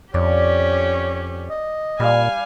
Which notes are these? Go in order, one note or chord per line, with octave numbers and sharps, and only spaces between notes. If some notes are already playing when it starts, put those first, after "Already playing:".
F2 C#4 G4 C#5 D5
D#5
A#2 G3 F5 G#5